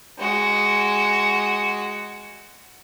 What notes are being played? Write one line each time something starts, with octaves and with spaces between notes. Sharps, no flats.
G#3 F#4